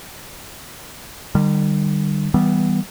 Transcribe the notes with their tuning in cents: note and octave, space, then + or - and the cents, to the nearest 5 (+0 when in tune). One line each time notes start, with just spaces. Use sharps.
D#3 -45 G3 +0
E3 -25 G3 -5 B3 +0